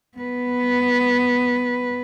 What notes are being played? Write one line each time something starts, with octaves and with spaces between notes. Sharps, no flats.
B3 B4